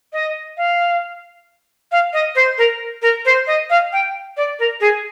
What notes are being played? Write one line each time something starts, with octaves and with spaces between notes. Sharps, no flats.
D#5
F5
F5
D#5
C5
A#4
A#4
C5
D#5
F5
G5
D5
A#4
G#4